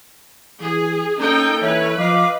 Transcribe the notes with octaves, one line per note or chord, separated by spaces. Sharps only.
E3 G#4
A#3 C#4 D#4 A4 G5
E3 C#4 B4 C#5 E5
F3 D#5 F5 D6